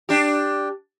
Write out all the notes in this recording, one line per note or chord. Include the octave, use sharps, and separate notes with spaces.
D4 G4